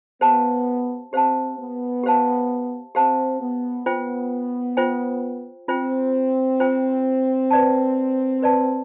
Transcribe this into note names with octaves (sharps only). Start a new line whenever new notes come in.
B3 G4 C5 F5 A5
C4 G4 C5 F5 A5
B3
G4 C5 F5 A5
C4 G4 C5 F5 A5
B3
B3 F4 C5 G5
F4 C5 G5
C4 F4 C5 G5
F4 C5 G5
B4 D5 A5
B4 D5 A5